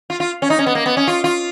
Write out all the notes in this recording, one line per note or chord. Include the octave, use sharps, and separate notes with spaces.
F4
F4
C#4
D#4
C#4
B3
A#3
B3
C#4
F4
F4